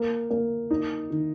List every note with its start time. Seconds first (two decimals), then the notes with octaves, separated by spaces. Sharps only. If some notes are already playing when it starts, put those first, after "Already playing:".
Already playing: A#3
0.30 A#3
0.71 D#4
1.10 D#3